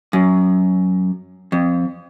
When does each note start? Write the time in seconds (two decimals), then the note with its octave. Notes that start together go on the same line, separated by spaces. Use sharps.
0.13 F#2
1.52 F2